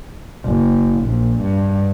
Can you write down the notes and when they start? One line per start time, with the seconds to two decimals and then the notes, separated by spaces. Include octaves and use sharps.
0.44 F#1
1.01 A#1
1.41 G2